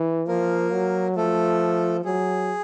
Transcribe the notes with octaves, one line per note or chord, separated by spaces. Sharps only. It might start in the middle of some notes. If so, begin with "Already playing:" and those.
Already playing: E3
F3 A#3 A#4
F#3
F3 A3 A4
F#3 G#4